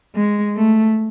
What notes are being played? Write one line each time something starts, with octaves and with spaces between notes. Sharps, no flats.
G#3
A3